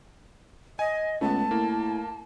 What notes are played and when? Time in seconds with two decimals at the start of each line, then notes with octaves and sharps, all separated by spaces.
0.79 D#5 G#5
1.21 C#2 A3 B3 A5
1.51 A2 A#3